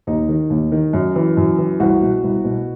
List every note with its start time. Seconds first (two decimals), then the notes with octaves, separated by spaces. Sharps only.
0.07 D#2 D#4
0.29 D#3
0.50 D#2
0.72 D#3
0.93 F#2
1.16 E3
1.37 F#2
1.58 E3
1.80 C2 F#4
2.01 B2
2.24 C2
2.44 B2